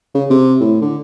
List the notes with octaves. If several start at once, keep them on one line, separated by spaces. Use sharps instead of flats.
C#3
C3
A2
D3